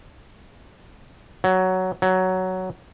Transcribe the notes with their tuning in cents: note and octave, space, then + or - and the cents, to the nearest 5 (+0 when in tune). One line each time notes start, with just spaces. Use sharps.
F#3 +10
F#3 +10